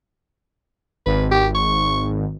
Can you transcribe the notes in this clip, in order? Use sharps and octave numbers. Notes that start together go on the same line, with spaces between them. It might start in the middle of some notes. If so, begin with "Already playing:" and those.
G#1 B4
G4
C#6